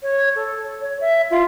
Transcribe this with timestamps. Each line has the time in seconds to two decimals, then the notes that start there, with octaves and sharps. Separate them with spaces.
0.03 C#5
0.36 A4
0.80 C#5
1.01 E5
1.31 F4